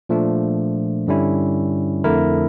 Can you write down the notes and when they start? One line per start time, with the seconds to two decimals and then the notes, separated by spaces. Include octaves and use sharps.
0.09 A#2 F3 A3 D4
1.07 G2 D3 G3 C#4 E4
2.04 F2 D3 A3 E4 A#4